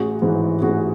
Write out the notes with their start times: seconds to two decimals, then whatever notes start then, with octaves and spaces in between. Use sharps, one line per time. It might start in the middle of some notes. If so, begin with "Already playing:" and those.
Already playing: A1 F#4 G#4
0.22 G#2 E3
0.61 A1 F#4 G#4